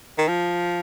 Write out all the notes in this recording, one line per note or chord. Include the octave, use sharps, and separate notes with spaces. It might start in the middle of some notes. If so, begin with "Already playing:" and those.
D#3
F3